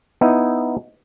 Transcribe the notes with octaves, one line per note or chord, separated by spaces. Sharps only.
B3 D#4 E4